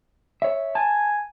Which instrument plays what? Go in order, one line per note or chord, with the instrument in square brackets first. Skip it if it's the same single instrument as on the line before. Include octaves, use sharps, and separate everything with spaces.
[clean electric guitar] C#5 E5
[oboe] G#5 [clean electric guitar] A5